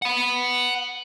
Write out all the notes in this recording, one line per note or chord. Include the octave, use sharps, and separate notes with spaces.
F#5 B5